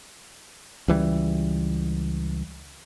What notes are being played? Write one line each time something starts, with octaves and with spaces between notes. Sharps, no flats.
C#2 E3 G3